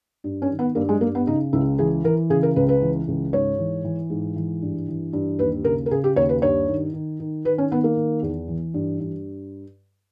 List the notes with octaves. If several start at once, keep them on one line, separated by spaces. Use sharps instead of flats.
G2
C#4
D#3
B3
G2 A#3
G#3
G2 A#3
B3
C#3 D#4
C#2 E4
E3 G#4
E3 A#4
C#3 G#4
A#4
C#2 B4
B4
E3
C#2
G#2 C#5
E3
E3
G#2
E3
G2
E3
G2
D#2 B4
C#3 A#4
A#4
C#3 G#4
G4
D#2 C#5
B4
G2 C#5
D#3
D#3
D#3
D#3 B4
C#4
D#3 B3
A#3
D#3
E2
E3
G2
G2